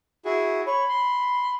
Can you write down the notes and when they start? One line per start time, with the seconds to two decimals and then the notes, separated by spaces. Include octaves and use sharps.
0.25 E4 F#4 G#4
0.67 C#5 B5
0.89 C6